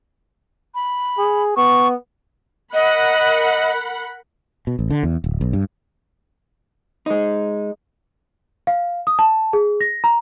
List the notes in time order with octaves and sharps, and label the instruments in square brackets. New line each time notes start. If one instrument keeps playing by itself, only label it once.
[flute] B5
[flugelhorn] G#4
[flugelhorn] B3 [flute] C#6
[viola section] A#4 F#5 B5 [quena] D#5
[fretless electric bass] B2
A1
D3
E2
D1
B1
G2
[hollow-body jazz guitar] G#3 D#4
[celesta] F5
D#6
A5
G#4
A#6
A#5